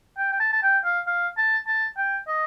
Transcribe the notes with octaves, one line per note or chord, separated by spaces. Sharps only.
G5
G5
A5
A5
G5
F5
F5
A5
A5
G5
D#5